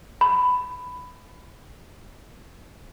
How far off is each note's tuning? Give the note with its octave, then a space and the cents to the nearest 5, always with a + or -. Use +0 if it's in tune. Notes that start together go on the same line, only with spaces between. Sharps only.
B5 +10